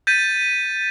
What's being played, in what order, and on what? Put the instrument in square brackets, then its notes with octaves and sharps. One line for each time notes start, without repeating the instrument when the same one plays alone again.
[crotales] G6 A6 B6 D#7